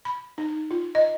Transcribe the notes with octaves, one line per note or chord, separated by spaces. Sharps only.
B5
D#4
F4
D#5